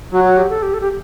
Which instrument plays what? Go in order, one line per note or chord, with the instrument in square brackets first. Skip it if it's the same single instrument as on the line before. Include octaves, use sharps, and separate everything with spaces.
[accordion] F#3 [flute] F#4
[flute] F#4
G4
A4
G4
A4
G4